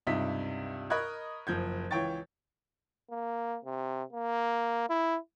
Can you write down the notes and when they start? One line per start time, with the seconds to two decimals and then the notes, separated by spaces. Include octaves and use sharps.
0.07 C#2 G2 C3 D#4 E5 B6
0.90 A#4 D#5 B5 C#6 F#6 G#6
1.47 F#1 F3 G6 G#6
1.91 C#2 E3 C#5 G5 C#6 A6
3.10 A#3
3.65 C3
4.13 A#3
4.89 E4